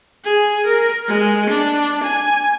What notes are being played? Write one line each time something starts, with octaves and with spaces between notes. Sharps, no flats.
G#4
A#4
G#3
D4
G#5